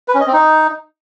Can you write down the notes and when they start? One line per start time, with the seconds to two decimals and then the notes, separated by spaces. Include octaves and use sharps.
0.08 B4
0.14 C#4
0.20 D#5
0.27 C4
0.33 D#4